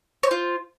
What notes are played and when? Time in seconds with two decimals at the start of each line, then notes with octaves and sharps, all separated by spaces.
0.23 C#5
0.27 C5
0.31 F4